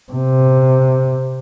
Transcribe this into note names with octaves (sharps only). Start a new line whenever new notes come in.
C3